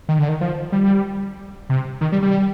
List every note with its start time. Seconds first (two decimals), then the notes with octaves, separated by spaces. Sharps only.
0.09 D#3
0.18 D3
0.29 D#3
0.41 F3
0.72 G3
1.69 C3
2.01 D#3
2.12 G3
2.22 G3